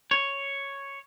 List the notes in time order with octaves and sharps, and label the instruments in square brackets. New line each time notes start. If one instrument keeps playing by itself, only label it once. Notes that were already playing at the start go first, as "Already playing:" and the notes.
[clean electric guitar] C#5